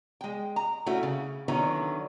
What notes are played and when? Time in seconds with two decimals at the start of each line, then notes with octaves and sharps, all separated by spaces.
0.21 G#3 G5
0.56 A#5
0.86 A3 C#4 E4 F#4
1.03 C#3
1.48 D3 D#3 F#3 B3 C#4 E4